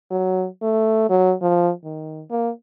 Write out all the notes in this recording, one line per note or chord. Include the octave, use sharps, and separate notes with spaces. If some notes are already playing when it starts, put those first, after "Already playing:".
F#3
A3
F#3
F3
D#3
A#3